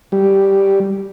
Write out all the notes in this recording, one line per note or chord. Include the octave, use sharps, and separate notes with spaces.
G3